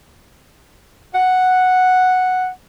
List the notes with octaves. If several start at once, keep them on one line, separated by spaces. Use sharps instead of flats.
F#5